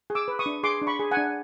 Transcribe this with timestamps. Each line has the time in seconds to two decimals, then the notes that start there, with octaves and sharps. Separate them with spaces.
0.10 G#4
0.15 D6 E6
0.28 B4
0.39 C#6 D#6
0.46 D4
0.64 G#4 C6 D6
0.82 D4
0.87 B5 C#6
0.99 G#4
1.11 F#5 G#5
1.17 D4